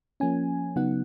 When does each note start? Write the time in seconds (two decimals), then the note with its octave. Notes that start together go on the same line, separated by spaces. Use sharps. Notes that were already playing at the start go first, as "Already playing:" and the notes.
0.20 F3 A#3 C#4 G#5
0.76 C#3 F#3 B3 D#4 F#5